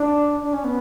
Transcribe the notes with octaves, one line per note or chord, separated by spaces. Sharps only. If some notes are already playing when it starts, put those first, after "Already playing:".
Already playing: D4
D4
C#4
B3